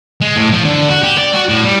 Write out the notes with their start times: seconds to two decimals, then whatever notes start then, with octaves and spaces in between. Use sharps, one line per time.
0.21 G#3
0.36 A2
0.52 F3
0.65 D3
0.88 F#4
1.03 G4
1.18 D5
1.33 F#4
1.49 A2
1.64 G3